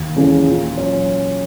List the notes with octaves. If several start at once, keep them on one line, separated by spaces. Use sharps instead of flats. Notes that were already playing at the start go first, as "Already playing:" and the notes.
Already playing: D#2
C#3 E3 G#3 C#4
A#2
F#3 C#4